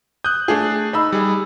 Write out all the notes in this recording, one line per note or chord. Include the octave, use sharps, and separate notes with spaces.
D#6 F#6 G6
A3 D4 G#4
D#4 B5 E6
G3 G#4